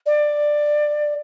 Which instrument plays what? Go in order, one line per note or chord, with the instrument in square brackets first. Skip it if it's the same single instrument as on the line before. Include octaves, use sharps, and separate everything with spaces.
[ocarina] D5